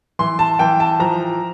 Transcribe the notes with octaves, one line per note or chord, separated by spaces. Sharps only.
E3 C6
A5
E3 G5
A5
F3 A#5